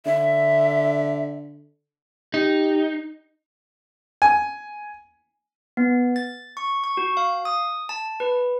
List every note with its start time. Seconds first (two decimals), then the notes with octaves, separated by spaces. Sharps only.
0.05 D3 E5
2.34 D#4 G4
4.22 G#5
5.77 B3
6.16 A6
6.57 C#6
6.84 C#6
6.97 F#4
7.17 F5
7.45 D#6
7.89 A5
8.20 B4